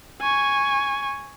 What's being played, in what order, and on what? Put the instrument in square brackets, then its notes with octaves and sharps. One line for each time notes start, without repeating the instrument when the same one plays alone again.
[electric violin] G#5 C#6